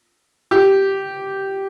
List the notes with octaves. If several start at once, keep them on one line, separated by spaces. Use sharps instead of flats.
G4